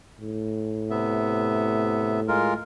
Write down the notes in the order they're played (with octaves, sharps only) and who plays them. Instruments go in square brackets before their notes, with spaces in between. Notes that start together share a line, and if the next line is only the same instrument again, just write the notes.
[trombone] A2
[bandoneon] C3 B3 E5
G#3 F4 A#4